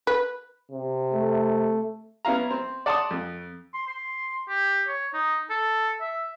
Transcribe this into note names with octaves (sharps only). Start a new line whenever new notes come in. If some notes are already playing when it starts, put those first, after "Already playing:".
B4
C3
A3
B3 C#4 E4 F5 A#5
C4
D5 F#5 A5 C6 D6 D#6
F2
C6
C6
G4
C#5
D#4
A4
E5